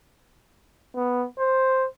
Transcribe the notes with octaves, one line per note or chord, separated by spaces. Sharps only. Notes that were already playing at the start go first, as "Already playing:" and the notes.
B3
C5